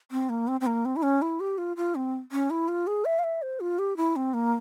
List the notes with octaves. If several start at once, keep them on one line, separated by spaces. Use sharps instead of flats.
C4
A#3
C4
C4
A#3
C4
E4
C#4
E4
G4
F4
F4
C4
C#4
E4
F4
G#4
E5
F5
E5
C5
F4
G4
E4
C4
A#3